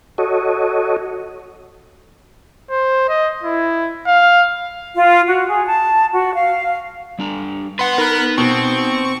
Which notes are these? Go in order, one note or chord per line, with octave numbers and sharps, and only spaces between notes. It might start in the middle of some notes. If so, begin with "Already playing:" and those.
F#4 A4 C#5 D#5
C5
D#5
E4
F5
F4
F#4
G#4
A5
F#4
F5
G3 D4 A#5
B3 B4 F#5 C6
D#4 A#4 B5 F#6
B2 C4 C#6